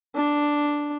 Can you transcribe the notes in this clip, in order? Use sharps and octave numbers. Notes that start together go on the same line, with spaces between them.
D4